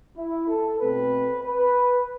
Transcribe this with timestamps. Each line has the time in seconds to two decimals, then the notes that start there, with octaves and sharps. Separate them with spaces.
0.16 E4
0.48 A4
0.80 B2 A3 C4 B4
1.45 B4